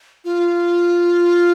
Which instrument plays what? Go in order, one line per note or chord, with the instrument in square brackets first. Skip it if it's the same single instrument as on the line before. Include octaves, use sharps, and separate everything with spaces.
[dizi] F4